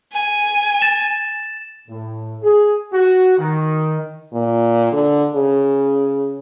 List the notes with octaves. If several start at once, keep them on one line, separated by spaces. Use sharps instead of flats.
G#5
A6 E7
A2
G#4
F#4
D#3
A#2
D3
C#3